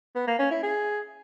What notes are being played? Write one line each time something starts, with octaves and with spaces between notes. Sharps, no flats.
B3
A#3
C#4
E4
G#4